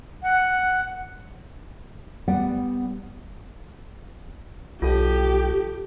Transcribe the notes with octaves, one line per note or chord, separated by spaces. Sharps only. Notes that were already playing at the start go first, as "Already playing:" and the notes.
F#5
G3 B3 D5 F#5
B1 F4 G4 A4